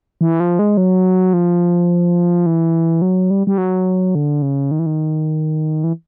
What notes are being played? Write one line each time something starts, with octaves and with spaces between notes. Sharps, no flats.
E3
F3
G#3
F#3
F3
E3
F#3
G3
G3
F#3
D3
C#3
D#3
E3
D#3
E3